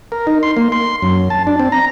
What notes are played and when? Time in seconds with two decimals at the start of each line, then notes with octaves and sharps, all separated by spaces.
0.12 A#4
0.27 D#4
0.43 C6
0.57 A#3
0.72 C6
1.02 F#2
1.30 A5
1.47 D4
1.59 C4
1.72 A#5